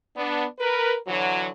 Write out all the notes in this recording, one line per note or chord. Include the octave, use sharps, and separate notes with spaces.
B3 D4
A#4 B4
D3 E3 F#3